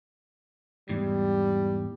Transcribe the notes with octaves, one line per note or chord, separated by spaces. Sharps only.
E2 G#2 G3